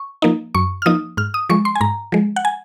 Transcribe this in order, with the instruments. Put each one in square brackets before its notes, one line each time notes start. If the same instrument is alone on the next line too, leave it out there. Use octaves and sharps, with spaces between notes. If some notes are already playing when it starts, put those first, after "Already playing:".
Already playing: [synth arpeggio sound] C#6
F3 A#3 D#4
F#2 C#6
F6
F3 A#3 D#4 D#6
G#2 F6
D#6
F3 G#3 C#6
C6
G#5
G#2 A#5
F3 G#3
F#5
G#5